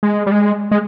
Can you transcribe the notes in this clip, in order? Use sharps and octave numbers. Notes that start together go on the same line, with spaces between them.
G#3
G3
G#3
G#3